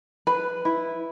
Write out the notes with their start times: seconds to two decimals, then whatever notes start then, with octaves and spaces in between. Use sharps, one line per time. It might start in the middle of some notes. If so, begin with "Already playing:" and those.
0.27 B4
0.65 E4